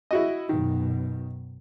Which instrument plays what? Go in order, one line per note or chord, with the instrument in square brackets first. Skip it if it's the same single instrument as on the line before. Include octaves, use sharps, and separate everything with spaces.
[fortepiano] E4 F#4 D#5
[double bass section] F#2 B2 [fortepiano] D#3